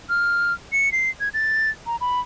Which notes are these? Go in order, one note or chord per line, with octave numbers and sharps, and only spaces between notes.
F6
C#7
C7
G#6
A6
A#5
B5